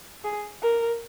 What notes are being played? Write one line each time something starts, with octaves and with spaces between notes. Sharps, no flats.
G#4
A#4